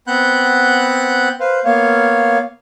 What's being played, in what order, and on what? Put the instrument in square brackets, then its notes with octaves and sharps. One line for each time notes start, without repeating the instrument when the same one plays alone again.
[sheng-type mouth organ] B3 C4 F#5 B5 F#6 G6
B4 C5 F5
A#3 B3 C#5 F5